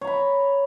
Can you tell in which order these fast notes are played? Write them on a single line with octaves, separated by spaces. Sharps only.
C#5 A#5 B5